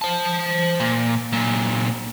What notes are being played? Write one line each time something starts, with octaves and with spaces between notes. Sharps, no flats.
C5 A5
A#2
A#2 F#3